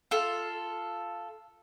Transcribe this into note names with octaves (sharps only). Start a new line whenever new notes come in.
F4 A4